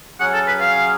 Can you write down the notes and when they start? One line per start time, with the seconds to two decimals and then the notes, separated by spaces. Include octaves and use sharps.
0.20 F#3 C#4 G#4 F#5
0.34 A4
0.47 B4
0.61 F5